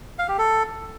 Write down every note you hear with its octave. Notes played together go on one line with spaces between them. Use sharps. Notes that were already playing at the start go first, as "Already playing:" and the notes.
F5
G4
A4